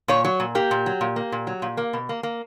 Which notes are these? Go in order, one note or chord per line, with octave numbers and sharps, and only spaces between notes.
A#2 C#5
F#3 C#5
A#2
A#3 G4
A#2
F#3
A#2
A#3
A#2
F#3
A#2
A#3
B2
A#3
A#3